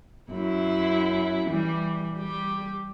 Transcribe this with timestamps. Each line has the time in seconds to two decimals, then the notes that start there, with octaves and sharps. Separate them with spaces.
0.30 F#2 E4
1.48 E3 G3
2.17 G3 G4